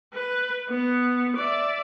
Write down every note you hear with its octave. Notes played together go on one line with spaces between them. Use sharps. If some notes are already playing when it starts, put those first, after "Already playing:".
B4
B3
D5 E5